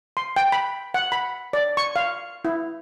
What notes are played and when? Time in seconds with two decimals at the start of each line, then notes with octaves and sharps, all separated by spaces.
0.17 C6
0.36 G5
0.52 B5
0.94 F#5
1.12 B5
1.53 D5
1.77 C#6
1.96 F5
2.45 E4